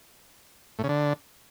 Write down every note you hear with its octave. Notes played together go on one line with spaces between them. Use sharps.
A2
C#3
D3